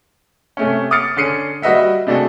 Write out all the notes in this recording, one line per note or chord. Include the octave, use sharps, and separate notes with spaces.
C3 A3 C#4
D6 D#6 F6 A6 C#7
D3 C#4 C7 C#7 D#7
G3 F#4 B4 D#5 E5 F#5
C3 A3 D4 F#4 G#4 A4